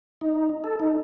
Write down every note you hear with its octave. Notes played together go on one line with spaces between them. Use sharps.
D#4
A4
D#4